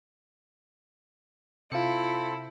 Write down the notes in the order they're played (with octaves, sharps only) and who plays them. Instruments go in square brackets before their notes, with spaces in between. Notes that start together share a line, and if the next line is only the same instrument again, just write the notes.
[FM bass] C3 [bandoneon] C4 A4 [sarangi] E4 [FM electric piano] F4 C#7